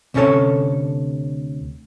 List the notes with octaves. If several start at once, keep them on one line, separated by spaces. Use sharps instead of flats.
D2 C3 C#4 D4 A4 C#5